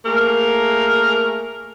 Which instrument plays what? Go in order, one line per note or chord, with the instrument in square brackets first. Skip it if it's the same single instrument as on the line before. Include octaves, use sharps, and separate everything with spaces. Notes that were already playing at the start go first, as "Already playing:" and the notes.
[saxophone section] A3 A#3 G#4 A#4